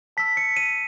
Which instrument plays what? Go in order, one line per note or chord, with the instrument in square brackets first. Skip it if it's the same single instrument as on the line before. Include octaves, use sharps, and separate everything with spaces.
[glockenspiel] A5 E6 B6
C#7
D#7